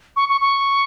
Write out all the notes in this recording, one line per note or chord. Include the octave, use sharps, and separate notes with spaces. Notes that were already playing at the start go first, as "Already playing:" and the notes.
C#6
C#6
C#6